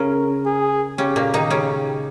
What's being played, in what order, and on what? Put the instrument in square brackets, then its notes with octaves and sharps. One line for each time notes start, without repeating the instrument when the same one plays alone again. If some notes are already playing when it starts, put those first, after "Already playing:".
Already playing: [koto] C#3 C#4 [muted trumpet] A#4
[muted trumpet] G#4
[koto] C#3 C#4 [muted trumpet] G4
[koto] A#2 A#3
D#3 D#4
[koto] C#3 C#4 [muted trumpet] G4